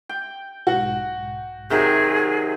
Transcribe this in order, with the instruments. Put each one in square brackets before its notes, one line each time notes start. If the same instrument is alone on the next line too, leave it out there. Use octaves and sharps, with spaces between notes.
[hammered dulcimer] G5
[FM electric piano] B1 G#2 [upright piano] F#4 F#5
[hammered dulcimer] C3 D#3 F#3 [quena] G#4